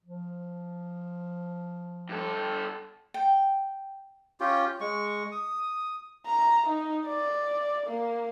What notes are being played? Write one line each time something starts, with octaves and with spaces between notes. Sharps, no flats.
F3
G2 A4
G5
C#4 F4 G4
G#3 C#6
D#6
A#5
D#4
D5
A#3